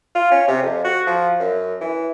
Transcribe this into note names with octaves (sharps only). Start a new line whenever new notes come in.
F4
C#4
C3
F2
F#4
F3
F#2
E3